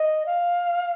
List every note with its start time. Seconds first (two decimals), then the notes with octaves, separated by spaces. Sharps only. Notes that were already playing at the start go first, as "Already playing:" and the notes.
Already playing: D#5
0.26 F5